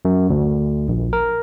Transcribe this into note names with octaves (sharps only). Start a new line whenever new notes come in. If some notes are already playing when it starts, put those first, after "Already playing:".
F#2
D2
A#1
A#4